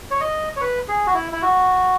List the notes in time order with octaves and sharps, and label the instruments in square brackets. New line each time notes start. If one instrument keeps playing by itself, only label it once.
[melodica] C#5
D#5
C#5
B4
G#4
F#4
E4
E4
F#4